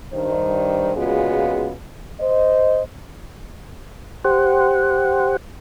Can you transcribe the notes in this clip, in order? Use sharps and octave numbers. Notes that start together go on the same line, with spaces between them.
G2 D#3 C5
A#2 C#3 G#3 B3 F4 F#4
C5 D#5
G4 C5 F#5